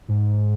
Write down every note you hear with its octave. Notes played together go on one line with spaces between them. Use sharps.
G#2